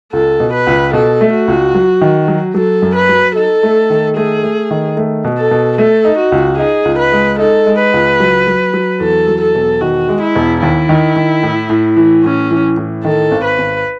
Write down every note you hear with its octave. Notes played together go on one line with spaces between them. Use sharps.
C#2 A4
B2
B4
C#2
B2 A4
A3
F#4
C#2
F#3
D#3
F#3
F#3 A4
F#2
B4
F#3
D#4 A4
A3
D#3
A3 G#4
A3
D#3
A3
B2
A4
B2
A3 A4
D#4
F#4
C#2
D#4 G#4
C#2
B4
G#3
D#4 A4
G#3
B4
C#2
F#3
F#3
F#3
E2 A4
F#3
A4
E1
D#3 F#4
G#3
E4
E1
D#2 E4
D#3
D#3
A2
A2
E3
A2 C#4
E3
A2
D#3 A4
G#1
B4
G#1